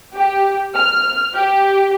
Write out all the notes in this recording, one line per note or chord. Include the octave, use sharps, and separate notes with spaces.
G4
F6
G4